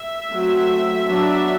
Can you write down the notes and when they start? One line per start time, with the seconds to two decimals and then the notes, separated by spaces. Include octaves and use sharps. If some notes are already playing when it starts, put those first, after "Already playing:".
Already playing: E5
0.32 F#3 A3 C4
1.07 F#3 B3 D4